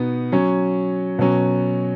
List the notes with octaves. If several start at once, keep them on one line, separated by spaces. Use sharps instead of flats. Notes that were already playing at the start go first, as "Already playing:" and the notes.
Already playing: B2 B3 D#4
F#3 C#4
B2 F#3 C#4